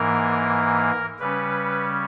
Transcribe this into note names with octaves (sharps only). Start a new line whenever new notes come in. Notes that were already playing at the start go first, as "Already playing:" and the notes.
Already playing: G#2 E3 A#3 A#4
C#3 G3 C#4 B4